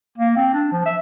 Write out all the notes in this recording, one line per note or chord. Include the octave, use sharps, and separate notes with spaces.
A#3
C4
D4
F3
E5